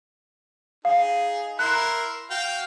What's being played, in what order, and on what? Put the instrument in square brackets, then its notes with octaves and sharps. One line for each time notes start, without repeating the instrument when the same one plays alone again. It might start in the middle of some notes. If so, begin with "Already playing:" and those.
[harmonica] D#4 G#4 [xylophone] F5
[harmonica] E4 A#4 C6 [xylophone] F#6
[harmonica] F#4 F5 G5